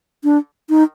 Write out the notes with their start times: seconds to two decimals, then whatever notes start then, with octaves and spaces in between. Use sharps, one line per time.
0.24 D4
0.69 D#4